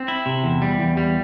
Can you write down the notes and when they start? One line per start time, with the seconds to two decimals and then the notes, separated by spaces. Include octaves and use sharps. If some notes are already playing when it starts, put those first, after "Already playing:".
Already playing: C4
0.08 E4
0.26 C3
0.44 E2
0.62 G3
0.80 E2
0.97 G3